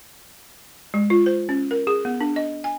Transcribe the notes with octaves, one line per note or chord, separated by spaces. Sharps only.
G#3
F4
C5
C#4
A#4
G#4
B3
D4
D#5
G#5